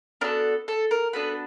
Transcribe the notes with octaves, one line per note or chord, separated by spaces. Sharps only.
B3 D4 F#4 A4 A#4
A4
A#4
B3 D4 F#4 A4 B4